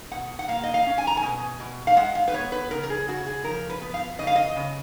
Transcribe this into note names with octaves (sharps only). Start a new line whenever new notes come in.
B2 F#5
F#5
A#3 F5
D#5
F5
C#4
G#5
A#5
G#5
B2
B2
F5
G#3 F#5
F5
B4
B3 C#5
B4
C#3 A#4
A#4
G#4
C#3 F#4
G#4
F3 A#4
B4
B3
F5
C#3 D#5
F5
D#5
C#3